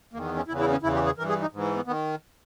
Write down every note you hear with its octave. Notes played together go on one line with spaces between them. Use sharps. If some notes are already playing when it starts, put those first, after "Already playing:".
E2 D#3 A#3
B3
C#4
E2 C#3 E3 E4
E4
C#4
E2 C#3 E3 E4
G4
G#4
G2 E3 A#4
G#4
D#4
G#2 E3
B3
D#3 B3